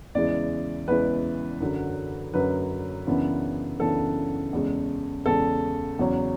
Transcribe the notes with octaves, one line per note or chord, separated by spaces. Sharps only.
E2 C#3 E3 G#3 D5
E2 C#3 E3 G#3 B4
F#2 D3 F#3
F#2 D3 F#3 B4
F#2 C#3 E3 B3 D4
F#2 C#3 E3 B3 D4 A4
E2 C#3 G#3
E2 C#3 G#3 A4
E2 C#3 F#3 C#4